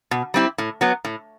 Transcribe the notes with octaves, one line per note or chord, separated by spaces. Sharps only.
B2
G3 C4 E4
A2
F#3 B3
A2